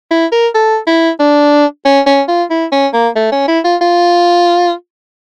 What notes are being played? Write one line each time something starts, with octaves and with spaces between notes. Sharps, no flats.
E4
A#4
A4
E4
D4
C#4
C#4
F4
E4
C#4
A#3
A3
C#4
E4
F4
F4